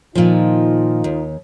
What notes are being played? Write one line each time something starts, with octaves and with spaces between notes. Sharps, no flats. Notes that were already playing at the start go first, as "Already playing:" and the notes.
A#2 D#3 F3 D#4 F4
D#2